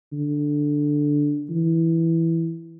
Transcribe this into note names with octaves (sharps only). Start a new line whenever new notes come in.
D3
E3